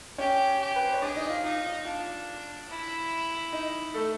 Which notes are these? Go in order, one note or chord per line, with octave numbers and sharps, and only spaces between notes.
C#4 G4 C#5
G4
B4
C5
C#5
D4 G#4 D5
D#4 D#5
F4 F5
D#4 F4 F5
D4 F4 F5
E4
D#4 D#5
A3 A4